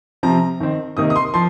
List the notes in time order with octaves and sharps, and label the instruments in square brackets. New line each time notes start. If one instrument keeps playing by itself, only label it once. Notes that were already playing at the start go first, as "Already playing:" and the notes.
[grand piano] C3 F3 C4 A#5
D#3 C4
C3 D#3 A#3 D#6
D#6
C6
F3 C6